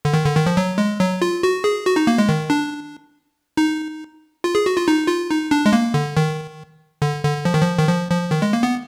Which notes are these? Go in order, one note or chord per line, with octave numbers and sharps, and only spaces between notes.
D3
D#3
D3
D#3
F3
F#3
G#3
F#3
F4
F#4
G#4
F#4
D#4
A#3
G#3
D#3
D4
D#4
F4
G#4
F#4
F4
D#4
F4
D#4
D4
G#3
A#3
D3
D#3
D3
D3
F3
D#3
F3
D#3
F3
F3
D#3
G#3
A#3
B3